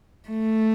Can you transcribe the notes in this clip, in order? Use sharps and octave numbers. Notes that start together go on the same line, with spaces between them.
A3